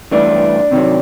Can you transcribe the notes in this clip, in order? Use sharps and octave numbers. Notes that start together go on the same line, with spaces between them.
G2 E3 A3 D4
C3 D#3 F#3